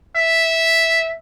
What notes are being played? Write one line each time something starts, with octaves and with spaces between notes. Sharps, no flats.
E5